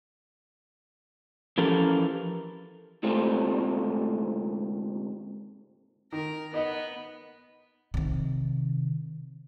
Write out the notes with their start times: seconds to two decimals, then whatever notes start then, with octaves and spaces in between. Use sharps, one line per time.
1.58 E3 F3 C#4 G4 A4 A#4
3.03 D2 G#2 C3 A3 C4 F4
6.12 D#3 A#4
6.54 B3 D#4 D#5 F#5
7.94 C3 D#3